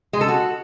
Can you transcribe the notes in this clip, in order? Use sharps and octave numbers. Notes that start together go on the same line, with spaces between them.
G#3
A4
F#4